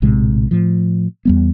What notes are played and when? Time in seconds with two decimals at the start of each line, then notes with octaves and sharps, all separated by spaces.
0.02 A#1 A2 C3 G#3
0.51 A2 F3
1.25 E2 G3 B3